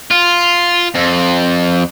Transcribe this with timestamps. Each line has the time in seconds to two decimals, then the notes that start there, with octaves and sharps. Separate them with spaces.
0.11 F4
0.95 F2